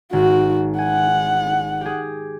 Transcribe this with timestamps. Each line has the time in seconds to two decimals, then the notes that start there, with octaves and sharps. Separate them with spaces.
0.13 G#1 F#4
0.78 F#5 G#5
1.81 G4 G#4